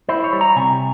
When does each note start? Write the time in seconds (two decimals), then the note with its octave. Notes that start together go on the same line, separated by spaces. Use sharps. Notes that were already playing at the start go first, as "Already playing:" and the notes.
0.09 E4 C5
0.24 C#5
0.33 G3
0.41 A#5
0.56 C3 G#5